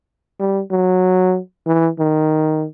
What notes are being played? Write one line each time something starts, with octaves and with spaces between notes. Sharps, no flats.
G3
F#3
E3
D#3